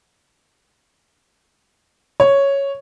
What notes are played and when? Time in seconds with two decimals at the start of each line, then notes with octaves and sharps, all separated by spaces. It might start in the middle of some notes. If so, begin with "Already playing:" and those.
2.20 C#5